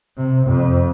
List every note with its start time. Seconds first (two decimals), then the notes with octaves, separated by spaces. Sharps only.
0.17 C3
0.48 F2